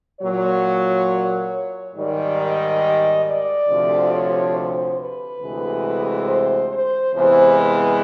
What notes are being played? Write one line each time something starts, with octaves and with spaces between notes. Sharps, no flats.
A#2 F#3 C#5
G#2 D#3 G3 D5
D#5
D5
D2 C3 F3
C#5
C5
B4
D2 C3 E3 G#3
C5
C5
E2 C3 E3 G#3 C5
B4